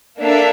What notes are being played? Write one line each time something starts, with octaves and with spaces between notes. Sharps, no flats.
A#3 D4 A4 E5